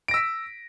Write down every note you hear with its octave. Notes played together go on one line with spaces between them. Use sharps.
E6 A#6 B6 D7